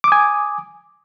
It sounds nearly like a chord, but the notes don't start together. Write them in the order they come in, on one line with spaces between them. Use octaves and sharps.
D6 D#6 G#5